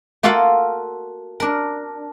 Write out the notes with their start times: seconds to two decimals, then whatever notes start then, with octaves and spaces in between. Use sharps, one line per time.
0.23 A#3 F4 F#4 A4 F5 F#5
1.40 D4 A#4